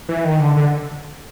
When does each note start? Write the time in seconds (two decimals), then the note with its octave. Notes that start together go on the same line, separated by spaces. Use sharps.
0.09 E3
0.24 D#3
0.40 D3
0.56 D3